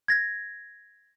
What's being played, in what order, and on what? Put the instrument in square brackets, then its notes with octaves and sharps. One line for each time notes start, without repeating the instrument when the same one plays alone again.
[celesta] G#6 A#6